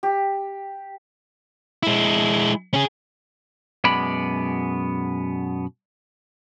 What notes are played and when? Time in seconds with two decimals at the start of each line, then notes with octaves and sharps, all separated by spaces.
0.03 G4
1.83 G#3 E4
2.74 C#4 G#4
3.84 F#2 B2 G#3 B3 D5 B5